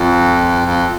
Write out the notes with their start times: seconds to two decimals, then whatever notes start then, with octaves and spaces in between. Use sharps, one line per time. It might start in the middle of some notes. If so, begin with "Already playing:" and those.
Already playing: F2
0.66 F2